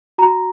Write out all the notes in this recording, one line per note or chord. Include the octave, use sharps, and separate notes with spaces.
F#4 A#5